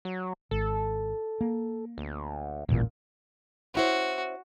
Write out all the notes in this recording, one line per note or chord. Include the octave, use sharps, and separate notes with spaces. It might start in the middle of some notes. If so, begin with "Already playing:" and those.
F#3
G#1 A4
A#3
D2
D#1 A1 E2 A#2
C#4 E4 F#4 C5